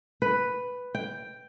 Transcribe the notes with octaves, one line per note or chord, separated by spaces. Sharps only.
B4
G5